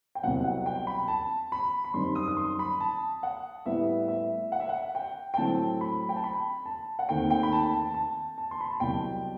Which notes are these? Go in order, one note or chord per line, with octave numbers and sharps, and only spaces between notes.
G5
C2 B2 F#3 C4 F#5
F#5
G5
B5
A5
B5
B5
F#2 D#3 G3 C4 C6
D#6
D#6
C6
B5
A5
F#5
A2 G3 B3 E5
E5
F#5
E5
F#5
G5
G5
A2 F#3 A3 C4 A5
B5
G5
A5
B5
A5
F#5
D#2 D#3 A3 C4 G5
G5
B5
A5
A5
A5
A5
C6
B5
A5
C2 B2 F#3 G5